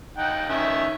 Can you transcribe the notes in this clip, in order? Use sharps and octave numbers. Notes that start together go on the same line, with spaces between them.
D#4 F#5 G5
D#3 C#4 E5